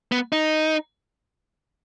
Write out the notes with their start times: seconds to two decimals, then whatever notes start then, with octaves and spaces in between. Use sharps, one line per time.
0.12 B3
0.32 D#4